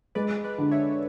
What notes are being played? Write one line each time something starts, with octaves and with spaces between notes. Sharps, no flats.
G#3 B4 D5
B4 D5
D3
C#5 E5